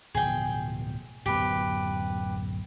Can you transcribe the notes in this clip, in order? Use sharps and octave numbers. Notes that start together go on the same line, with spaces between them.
D1 B2 F3 G#4 G5
D1 F#2 B3 G4 B4